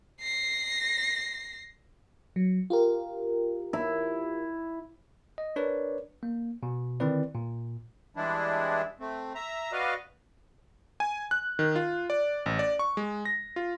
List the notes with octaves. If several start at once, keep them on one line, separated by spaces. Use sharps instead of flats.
A#6 C7
F#3
F4 G4 A#4
E4
D#5
D4 A#4 B4 C#5 D5
A#3
B2
D3 D#3 C4 E4 B4 D5
A#2
E3 G3 G#3 D4 E4
A3 C4
E5 A#5
F#4 B4 D5 D#5 F5
G#5
F#6
D#3
F4
D5
A1
D5
C#6
G#3
A#6
F4